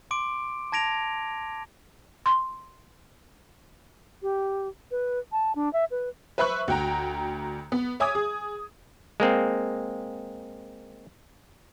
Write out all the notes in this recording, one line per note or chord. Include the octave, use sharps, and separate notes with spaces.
C6 D6 D7
A5 G#6 A#6 D7 F7
G#6
C6
G4
B4
A5
D4
E5
B4
B4 C5 E5 B5 C#6 F#6
D2 F#4 G5 A#5
B3
C#5 E5 G#5 D6 D#6 G#6
G#4
G#3 A#3 C4